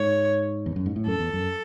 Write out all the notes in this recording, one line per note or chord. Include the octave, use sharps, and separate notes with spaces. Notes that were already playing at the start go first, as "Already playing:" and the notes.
Already playing: G#2 C#5
E2
F#2
G#2
A2
F#2 A4
E2
F#2